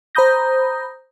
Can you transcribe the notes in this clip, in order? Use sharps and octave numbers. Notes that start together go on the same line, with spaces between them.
C5 A#5 B5 D#6 G6 A#6